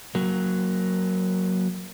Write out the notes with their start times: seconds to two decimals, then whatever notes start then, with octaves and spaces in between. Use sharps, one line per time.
0.15 F#3 A#3